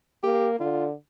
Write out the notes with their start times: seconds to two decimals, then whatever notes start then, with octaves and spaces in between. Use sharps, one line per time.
0.23 A#3 G4
0.60 D3 F4